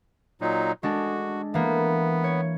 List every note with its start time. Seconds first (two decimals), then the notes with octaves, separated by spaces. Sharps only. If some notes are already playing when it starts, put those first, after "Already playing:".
0.41 A#2 F#3 D#4
0.83 G#3 D4 F#4 A4
1.54 E3 A#3 B3
2.24 C#5